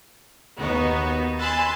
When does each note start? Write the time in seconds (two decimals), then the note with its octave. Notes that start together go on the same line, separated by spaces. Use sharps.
0.58 D#2 B3 D#4 F#4
1.38 G#5 B5 C6 E6 F#6 A6